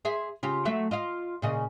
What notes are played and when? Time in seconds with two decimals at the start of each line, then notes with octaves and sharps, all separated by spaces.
0.05 G#4 C5 E5
0.43 C#3 F4 G4
0.65 F#3 A3 E5
0.91 F4 D#5 F5
1.42 A#2 C#3 D#5